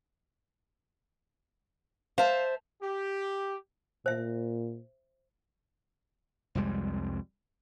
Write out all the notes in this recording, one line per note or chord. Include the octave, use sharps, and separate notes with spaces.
C5 E5 F5 A5
G4
A#2 C5 E5
C2 F2 G3 G#3